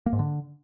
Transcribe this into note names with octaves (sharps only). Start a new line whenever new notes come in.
A#3
G#2
D3